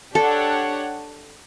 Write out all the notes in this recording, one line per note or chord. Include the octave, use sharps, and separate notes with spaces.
D4 G4 A4 C#5 F#5